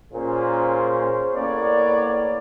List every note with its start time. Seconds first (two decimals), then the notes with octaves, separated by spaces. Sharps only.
0.13 A#2 C#4 G#4 C5
1.35 A2 A#3 B3 C#5 D5